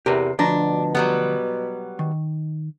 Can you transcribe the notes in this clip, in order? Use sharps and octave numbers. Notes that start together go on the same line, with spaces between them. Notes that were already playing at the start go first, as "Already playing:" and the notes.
E2 C3 G4 A#4 B4
D2 B2 F3 D4 A#5
F#3 G3 B3
D#3